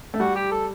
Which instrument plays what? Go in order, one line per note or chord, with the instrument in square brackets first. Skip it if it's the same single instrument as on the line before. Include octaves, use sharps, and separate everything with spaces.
[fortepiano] A3
[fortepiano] G3 [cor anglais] F#4
[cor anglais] G4
A4